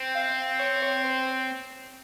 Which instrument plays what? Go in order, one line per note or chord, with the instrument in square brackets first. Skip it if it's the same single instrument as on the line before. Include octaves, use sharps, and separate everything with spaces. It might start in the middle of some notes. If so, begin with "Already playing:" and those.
Already playing: [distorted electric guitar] C4
[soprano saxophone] F5
C#5
C#5
C5